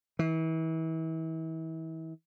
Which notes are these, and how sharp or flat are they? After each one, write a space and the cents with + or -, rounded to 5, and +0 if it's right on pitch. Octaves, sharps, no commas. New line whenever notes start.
E3 -35